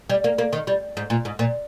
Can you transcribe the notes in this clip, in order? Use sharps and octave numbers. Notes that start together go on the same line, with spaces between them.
G3
A#3
A#3
D#3
G3
G#2
A#2
G#2
A#2